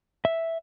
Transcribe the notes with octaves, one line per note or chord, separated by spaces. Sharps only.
E5